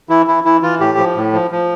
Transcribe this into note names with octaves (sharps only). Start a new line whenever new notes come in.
E3 E4
E3 E4
E3 E4
E3 F4
A2 G4
F3
A2
F3
F3